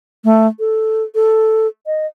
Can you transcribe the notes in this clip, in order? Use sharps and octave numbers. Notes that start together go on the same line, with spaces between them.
A3
A4
A4
D#5